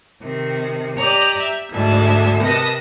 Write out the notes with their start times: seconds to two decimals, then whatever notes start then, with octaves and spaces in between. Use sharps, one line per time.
0.21 C3 D#3
0.96 G4 D5 D#5 A#5
1.39 E5
1.71 D2 G#2 D4 E5 A5
2.41 C3 A#4 B4 D#5 A5 A#6